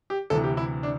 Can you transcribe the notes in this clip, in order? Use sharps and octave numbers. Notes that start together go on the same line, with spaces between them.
G4
D2 C3 E3 A4
G4
E4
D4